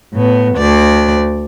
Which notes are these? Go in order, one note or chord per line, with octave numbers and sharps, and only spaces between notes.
A2 B3
D2 D5